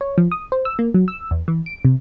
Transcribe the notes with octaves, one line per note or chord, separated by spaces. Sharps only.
C#5
F3
D#6
C5
E6
A#3
F#3
E6
E2
E3
D7
C3